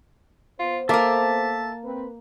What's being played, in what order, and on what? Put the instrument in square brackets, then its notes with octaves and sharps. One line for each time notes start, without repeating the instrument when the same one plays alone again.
[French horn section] B3 C5 [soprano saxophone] F4
[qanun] A#3 A#4 [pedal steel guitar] A4 E5 D6 [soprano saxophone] A5
[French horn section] C4 B4